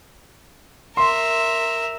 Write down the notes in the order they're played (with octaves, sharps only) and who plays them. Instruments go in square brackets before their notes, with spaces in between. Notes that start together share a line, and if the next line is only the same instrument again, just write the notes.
[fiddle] A#4 E5 [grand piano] C6